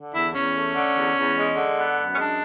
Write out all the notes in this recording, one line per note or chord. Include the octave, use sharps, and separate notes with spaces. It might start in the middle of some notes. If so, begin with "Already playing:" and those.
Already playing: D3
E2 E4
E2 C#4
A3
D3
E2
E2
G#3
D3
B3
F#2
C#4
G#3 D4